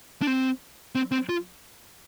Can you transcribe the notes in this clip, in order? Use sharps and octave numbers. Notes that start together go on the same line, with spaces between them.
D4
C4
C4
C4
F4